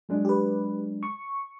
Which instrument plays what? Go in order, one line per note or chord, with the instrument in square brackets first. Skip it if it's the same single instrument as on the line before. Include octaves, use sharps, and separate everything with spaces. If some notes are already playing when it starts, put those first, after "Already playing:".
[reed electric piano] F#3 G#3 D4
[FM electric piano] G4 B4
C#6